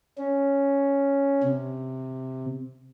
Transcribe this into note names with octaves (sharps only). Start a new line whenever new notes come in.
C#4
C3